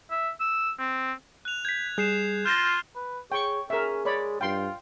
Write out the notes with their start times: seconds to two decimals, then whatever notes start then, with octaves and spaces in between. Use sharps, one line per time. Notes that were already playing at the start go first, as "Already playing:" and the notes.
0.11 E5
0.40 E6
0.79 C4
1.45 F#6 F7
1.65 G6 G#6 B6
1.98 G3 G#4 G6 C7 E7
2.46 F4 F6 G6 A6 A#6 E7 G7
2.96 B4
3.32 G#4 C#5 G5 C#6
3.70 C#4 G#4 A#4 E5
4.05 G#3 C#5 D5 B5
4.41 G2 F4 G5 C6